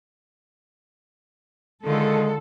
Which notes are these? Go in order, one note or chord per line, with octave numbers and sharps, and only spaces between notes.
D3 D#3 G#3 F4 A4